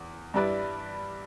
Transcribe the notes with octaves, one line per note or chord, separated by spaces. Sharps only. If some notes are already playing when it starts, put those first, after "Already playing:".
Already playing: E2
G2 G3 E4 B4 D5